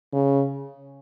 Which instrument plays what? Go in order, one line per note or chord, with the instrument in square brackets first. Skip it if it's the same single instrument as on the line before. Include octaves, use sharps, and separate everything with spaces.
[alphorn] C#3